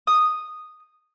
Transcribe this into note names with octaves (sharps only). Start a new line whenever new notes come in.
D#6